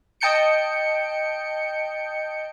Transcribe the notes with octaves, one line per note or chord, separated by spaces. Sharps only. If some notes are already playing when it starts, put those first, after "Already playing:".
D#5 G5 A5 G6 C#7 D7